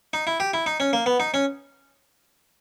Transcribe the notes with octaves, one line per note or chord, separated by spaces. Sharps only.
D#4
E4
G4
E4
D#4
C#4
A#3
B3
D#4
C#4